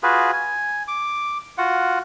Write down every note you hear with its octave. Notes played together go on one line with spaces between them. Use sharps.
F4 F#4 G#4 B4
G#5
D6
F4 F#4 F#5